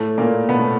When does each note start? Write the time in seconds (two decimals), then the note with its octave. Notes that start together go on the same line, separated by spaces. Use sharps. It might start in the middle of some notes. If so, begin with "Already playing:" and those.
Already playing: A2 A3
0.18 A#2 A#3
0.48 B2 B3
0.59 A3